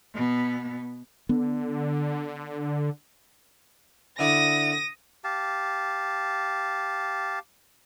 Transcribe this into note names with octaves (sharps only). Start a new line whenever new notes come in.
B2 B3
D3 B3
D3 E4 D5 D#6 A#6
G4 F5 A5